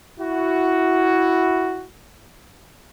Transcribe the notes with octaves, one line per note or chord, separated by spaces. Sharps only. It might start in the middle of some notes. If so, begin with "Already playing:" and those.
E4 F#4